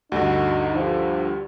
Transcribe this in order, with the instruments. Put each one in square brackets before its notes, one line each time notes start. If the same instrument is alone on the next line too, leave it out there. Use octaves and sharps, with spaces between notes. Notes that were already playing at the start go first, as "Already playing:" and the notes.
[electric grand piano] D2 G2 D3 [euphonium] D#4 [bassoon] F#4
[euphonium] F3 [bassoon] G3